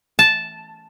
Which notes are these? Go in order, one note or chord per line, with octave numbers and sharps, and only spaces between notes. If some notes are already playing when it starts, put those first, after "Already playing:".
A5